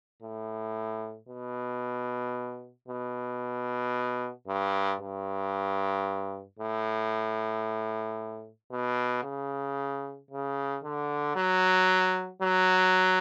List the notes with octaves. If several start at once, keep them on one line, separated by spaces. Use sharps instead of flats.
A2
B2
B2
G2
G2
A2
B2
C#3
C#3
D3
F#3
F#3